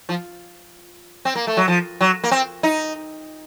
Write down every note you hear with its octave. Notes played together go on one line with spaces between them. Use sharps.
F3
C4
A#3
A3
F#3
F3
F#3
A#3
C4
D#4